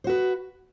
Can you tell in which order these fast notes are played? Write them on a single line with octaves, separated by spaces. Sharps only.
C5 F#4 B4